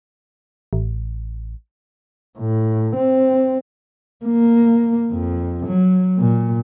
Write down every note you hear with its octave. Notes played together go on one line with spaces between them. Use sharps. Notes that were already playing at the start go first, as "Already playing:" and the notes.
A1
A2
C4
A#3
F2
F#3
A#2